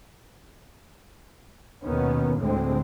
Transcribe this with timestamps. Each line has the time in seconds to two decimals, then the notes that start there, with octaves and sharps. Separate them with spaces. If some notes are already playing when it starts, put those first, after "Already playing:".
1.84 D#2 B2 D#3 B3 C#4
2.39 D2 A2 D3 G#3 C4